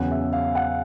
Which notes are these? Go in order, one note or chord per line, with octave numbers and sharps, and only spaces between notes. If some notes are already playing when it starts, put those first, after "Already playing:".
Already playing: E2 C#3 F#3 F#5
E5
F5
F#5